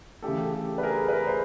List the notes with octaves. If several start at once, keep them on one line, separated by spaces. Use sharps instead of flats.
C#3 E3 A3 G4 A4
G4 A4
B4
G#4 A#4
B4
G#4 A#4
C5